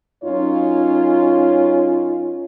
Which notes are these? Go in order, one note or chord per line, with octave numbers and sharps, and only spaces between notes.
F#2 C#4 D#4 F4 C#5